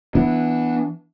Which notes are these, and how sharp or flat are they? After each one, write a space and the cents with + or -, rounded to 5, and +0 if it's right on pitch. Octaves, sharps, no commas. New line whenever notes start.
E3 -10 B3 -5 D4 +0